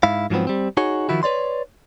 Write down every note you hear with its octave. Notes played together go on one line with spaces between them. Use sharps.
G#2 E4 F5
G#2 F3 F#3 B3 C4
G3 C4
D#4 F#4 G#4 C#5
D#3 F3 E4 F#4
B4 C#5 D5 C6